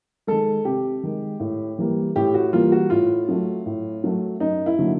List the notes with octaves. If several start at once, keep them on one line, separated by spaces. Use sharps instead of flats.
D#3 G#3 A4
C3 G4
D#3 G#3
A2
E3 G3 A#3
A2 G4
F#4
E3 G3 A#3 F4
F#4
A2 F4
F#3 A3
A2
F#3 A3
F#2 D#4
E4
D3 F#3 A#3